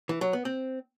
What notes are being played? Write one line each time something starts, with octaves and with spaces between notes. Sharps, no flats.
E3
F#3
B3
C4